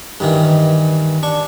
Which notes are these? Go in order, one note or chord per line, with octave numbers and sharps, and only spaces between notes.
G2 D#3 E3
D4 C#6